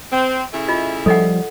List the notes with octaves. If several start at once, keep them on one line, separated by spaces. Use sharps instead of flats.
C4
C#3 A3 E4
F4 D#5
F3 G3 A4 D#5 F#5